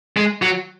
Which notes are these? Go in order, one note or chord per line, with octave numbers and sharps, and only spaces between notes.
G#3
F#3